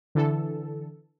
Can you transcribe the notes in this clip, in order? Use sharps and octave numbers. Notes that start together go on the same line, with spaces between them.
D3 E3 A4